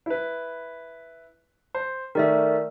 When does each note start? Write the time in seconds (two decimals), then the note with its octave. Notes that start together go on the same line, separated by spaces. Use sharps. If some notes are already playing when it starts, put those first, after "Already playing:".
0.06 E4 B4
1.75 C5
2.15 D#3 A3 A#4 D5 E5